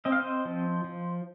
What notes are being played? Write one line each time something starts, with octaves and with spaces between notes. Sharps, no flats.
C4 D#5
F5
C5 D#5
F3
F3